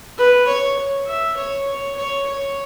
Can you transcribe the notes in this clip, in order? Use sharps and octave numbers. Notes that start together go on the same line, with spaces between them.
B4
C#5
E5
C#5
C#5
C#5
C#5